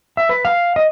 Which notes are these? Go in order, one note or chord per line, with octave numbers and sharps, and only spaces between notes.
E5
B4
F5
D#5